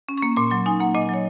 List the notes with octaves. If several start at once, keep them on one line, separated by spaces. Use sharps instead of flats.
C#4
A#3 C#6
A#2 C6
F#3 C6
D#4 G#5
A#3 F#5
A#2 D#5
F#3
C#5